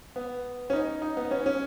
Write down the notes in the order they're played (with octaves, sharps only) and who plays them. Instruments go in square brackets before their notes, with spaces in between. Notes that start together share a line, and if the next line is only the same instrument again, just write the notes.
[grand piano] B3
C#4
D#4
D#4
B3
C#4
C#4